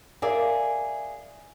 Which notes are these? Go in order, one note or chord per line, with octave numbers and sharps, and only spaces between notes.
G#4 A#4 D5 E5 F5 G#5